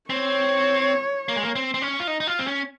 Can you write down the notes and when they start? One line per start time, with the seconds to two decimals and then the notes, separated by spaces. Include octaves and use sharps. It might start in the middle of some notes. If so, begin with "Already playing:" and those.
0.10 C4 C#5
1.28 A#3
1.36 G#3
1.43 A#3
1.55 C4
1.74 C4
1.82 C#4
2.00 F4
2.07 D#4
2.20 D#4
2.27 F4
2.39 C4
2.47 C#4